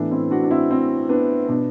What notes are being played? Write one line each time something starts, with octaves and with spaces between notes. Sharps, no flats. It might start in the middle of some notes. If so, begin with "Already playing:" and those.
Already playing: A2 E3 B3 D4
C4 E4
D4 F#4
D4
C4 E4
C4 E4
B3 D4
B2 B3 D4